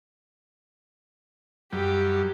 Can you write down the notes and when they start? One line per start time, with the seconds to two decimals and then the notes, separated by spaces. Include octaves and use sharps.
1.73 F#2 G3 G4